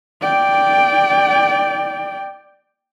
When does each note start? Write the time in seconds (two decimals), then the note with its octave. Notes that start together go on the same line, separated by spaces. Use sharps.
0.22 D5 G5